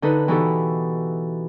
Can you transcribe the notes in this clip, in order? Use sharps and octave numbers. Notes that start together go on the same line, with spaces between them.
D3 D#4 A4 B4
B2 E3 D#4 F#4 G4 A4